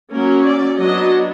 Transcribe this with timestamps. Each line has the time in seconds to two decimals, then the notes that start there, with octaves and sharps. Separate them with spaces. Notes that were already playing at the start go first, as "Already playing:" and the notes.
0.11 F#3 A#3 C#4 A#4
0.45 D5
0.78 F#3 B3 D4 D#5